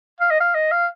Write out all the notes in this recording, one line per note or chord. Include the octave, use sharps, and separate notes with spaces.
F5
D#5
F5
D#5
F5